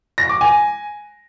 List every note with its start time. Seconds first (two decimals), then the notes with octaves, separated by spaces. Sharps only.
0.18 A#6
0.29 D6
0.41 G#5